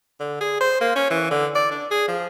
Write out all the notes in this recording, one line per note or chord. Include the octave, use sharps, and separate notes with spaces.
D3
G#4
C5
A#3
C#4
E3
D3
D5
D4
G#4
F3